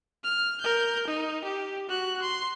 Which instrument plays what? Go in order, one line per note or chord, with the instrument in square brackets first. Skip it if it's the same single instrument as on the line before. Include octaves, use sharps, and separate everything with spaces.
[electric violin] F6
A#4 G6
D#4
G4
F#4 F#6
C6